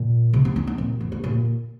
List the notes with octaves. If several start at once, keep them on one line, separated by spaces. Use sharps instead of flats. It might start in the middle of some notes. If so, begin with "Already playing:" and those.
Already playing: A#2
C3
C4
D4
C4
A#2
F2
G2
A#2